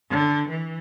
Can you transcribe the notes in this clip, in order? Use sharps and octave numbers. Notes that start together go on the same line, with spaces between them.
D3
E3